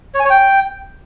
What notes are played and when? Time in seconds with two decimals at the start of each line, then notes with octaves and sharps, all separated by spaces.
0.15 C#5
0.20 G#5
0.25 C#5
0.30 G5